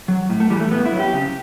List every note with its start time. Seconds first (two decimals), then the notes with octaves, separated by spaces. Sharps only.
0.08 F#3
0.30 A2
0.40 A3
0.50 E3 G3
0.60 A3
0.71 A2 B3
0.86 E4
0.92 F#3
0.99 G4
1.13 C#3